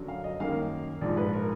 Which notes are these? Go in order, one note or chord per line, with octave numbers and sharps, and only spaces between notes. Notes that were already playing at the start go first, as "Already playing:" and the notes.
Already playing: F#2 D3 F#3
F5
D#5
F#2 D#3 A#3 F5
A#1 G#2 F3 D5
B4
A#4